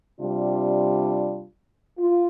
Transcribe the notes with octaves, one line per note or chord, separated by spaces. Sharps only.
C3 G3 D4 F4
F4